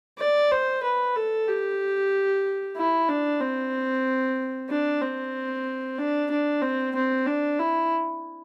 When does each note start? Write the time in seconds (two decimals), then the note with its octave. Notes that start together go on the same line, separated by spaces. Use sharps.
0.19 D5
0.51 C5
0.83 B4
1.16 A4
1.49 G4
2.77 E4
3.09 D4
3.41 C4
4.69 D4
5.01 C4
5.98 D4
6.31 D4
6.62 C4
6.95 C4
7.27 D4
7.59 E4